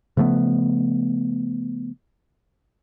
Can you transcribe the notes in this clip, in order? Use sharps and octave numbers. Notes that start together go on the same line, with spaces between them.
C#3 F3 A3 B3